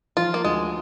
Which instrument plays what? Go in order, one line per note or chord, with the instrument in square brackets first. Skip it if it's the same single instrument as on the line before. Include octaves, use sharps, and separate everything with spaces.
[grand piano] F3 [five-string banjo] F4
[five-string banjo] A#3
[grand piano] D2 [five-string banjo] G#3